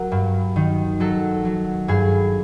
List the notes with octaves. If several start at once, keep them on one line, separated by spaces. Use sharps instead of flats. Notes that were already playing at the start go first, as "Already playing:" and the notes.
Already playing: F#3 A#4
G2
D#3
F#3 A4
F#3
G2 G#4